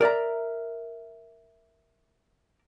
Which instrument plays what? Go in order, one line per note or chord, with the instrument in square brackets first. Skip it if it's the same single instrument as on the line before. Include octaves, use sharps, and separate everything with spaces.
[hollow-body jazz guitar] A#4 D5 E5 A#5